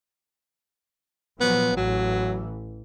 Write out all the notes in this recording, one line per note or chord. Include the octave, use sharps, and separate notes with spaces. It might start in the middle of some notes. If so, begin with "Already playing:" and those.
A#2 F3 F#3 B3
A1 E3 F#3